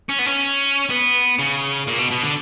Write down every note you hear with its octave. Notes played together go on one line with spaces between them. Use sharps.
C#4
B3
C#4
B3
C#3
A#2
B2
B2
D3